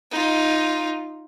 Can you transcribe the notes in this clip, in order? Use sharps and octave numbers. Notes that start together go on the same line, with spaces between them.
D#4 F4